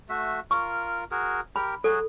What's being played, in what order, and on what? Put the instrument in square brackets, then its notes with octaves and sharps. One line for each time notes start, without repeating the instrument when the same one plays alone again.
[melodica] A3 F#4 E5
[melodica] F4 A#4 [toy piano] C#6
[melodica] F#4 G#4 A#4
[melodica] G4 A#4 [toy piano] B5
[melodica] F#3 F#4 G#4 [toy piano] A4